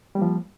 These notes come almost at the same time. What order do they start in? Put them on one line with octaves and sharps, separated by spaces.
G3 A#3 F3